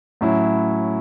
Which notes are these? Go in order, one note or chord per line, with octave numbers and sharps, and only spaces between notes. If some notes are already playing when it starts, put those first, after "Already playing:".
A2 F#3 C#4 E4